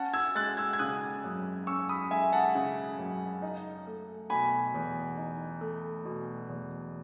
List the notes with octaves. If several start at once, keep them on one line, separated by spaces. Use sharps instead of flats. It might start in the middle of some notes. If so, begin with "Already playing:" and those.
Already playing: C#4 F#5 A5
E6 G#6
G#3 F#6 A6
E6 G#6
G#6
C#3 D#6 F#6
F#2
C#4 C#6 E6
B5 D#6
G#3 E5 G#5
F#5 A5
C#3
F#2
D#4
A3
B2 G#5 B5
E2
D#4
A3
B2
E2